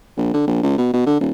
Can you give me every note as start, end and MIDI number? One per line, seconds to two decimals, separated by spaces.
0.18 0.32 34
0.34 0.46 50
0.47 0.59 34
0.63 0.73 37
0.78 0.91 47
0.94 1.03 47
1.07 1.17 50
1.20 1.31 27